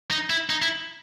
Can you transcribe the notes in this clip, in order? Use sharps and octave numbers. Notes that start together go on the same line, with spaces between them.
D#4
E4
D#4
E4